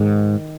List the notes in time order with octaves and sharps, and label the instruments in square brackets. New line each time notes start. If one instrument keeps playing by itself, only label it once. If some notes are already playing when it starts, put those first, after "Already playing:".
Already playing: [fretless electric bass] G#2 D#3